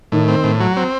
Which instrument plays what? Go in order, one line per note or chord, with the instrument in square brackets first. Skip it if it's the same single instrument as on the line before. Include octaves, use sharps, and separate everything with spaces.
[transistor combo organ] A2 [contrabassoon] D#3
[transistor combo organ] C4
A2
F#3
C4